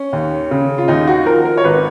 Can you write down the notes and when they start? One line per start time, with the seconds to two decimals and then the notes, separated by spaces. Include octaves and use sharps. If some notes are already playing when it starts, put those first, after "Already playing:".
Already playing: C#4
0.13 D#2
0.51 C#3
0.78 F4
0.88 D#2 D#4
1.07 F#4
1.26 F3 A#4
1.45 A#4
1.57 C#5
1.64 G#1 B4